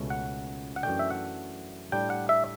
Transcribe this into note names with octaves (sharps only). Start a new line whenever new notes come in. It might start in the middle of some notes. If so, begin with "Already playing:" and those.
Already playing: C#2 B2 A3 C#4
F#5
F#5
F#2 E3 A3 D4 G5
E5
F#5
A2 G3 D4 G5
F#5
E5